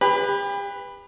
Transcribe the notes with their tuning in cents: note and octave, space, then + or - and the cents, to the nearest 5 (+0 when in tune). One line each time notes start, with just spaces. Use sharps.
G4 +40 B4 +0